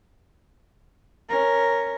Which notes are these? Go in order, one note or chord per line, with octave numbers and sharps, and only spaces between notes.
C#4 A#4